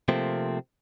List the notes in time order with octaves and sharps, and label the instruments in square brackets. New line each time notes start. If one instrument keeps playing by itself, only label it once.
[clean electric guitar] C3 F3 A3 A#3 C4